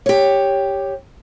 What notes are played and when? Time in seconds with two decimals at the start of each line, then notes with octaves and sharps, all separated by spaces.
0.06 G4 C#5